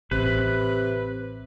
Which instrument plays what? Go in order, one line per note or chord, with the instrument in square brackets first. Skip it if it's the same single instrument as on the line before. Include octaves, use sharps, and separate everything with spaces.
[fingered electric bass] A1 [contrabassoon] C3 [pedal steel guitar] B4